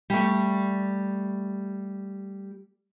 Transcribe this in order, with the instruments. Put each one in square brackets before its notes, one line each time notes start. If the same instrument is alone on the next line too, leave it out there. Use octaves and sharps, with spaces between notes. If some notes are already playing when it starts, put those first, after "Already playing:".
[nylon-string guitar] G3 A3